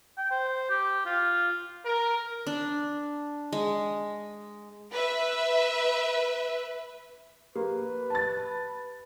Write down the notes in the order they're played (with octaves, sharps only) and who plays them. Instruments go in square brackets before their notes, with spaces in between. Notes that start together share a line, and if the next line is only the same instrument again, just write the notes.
[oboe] G5
C5
G4
F4
[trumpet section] A#4
[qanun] D4
G#3
[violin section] B4 E5
[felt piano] A#3 [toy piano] G4 [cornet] B4
[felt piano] A5 A6